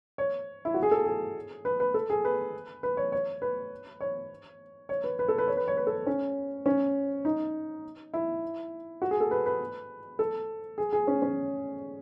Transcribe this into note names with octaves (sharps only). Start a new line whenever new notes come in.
C#5
E4
F#4
G#4
A4
G#4
B4
B4
A4
G#4
B4
B4
C#5
C#5
B4
C#5
C#5
B4
B4
A4
B4
C#5
B4
C#5
B4
A4
C#4
C#4
D#4
E4
F#4
G#4
A4
B4
B4
A4
G#4
G#4
C#4
C#4